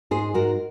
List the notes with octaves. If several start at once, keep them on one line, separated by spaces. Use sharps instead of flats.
G#2 G#4 C5
G#2 F#4 A#4